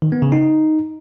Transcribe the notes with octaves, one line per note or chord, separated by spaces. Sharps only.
D#3
B3
C#3
D#4